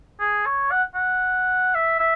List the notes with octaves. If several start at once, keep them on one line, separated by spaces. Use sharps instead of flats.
G#4
C#5
F#5
F#5
E5
E5